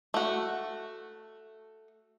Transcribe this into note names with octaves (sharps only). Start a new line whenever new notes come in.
A3 F#4